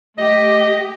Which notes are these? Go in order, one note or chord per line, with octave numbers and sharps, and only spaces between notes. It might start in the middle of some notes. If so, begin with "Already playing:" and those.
A3 G4 D#5